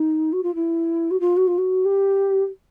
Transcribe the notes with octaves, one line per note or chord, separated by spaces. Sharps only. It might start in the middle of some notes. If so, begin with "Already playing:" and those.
Already playing: D#4
F#4
F4
E4
F#4
F4
F#4
F4
F#4
G4